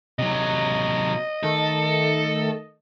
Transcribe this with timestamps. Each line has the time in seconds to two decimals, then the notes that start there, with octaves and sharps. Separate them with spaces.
0.19 C3 F#3 D#5
1.43 D#3 A3 A4